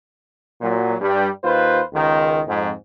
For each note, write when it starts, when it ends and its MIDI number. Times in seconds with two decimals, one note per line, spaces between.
0.61 0.93 46
0.61 0.93 54
1.00 1.28 43
1.00 1.28 55
1.43 1.81 39
1.43 1.81 65
1.43 1.81 71
1.43 1.81 72
1.93 2.40 37
1.93 2.40 51
2.47 2.71 41
2.47 2.71 44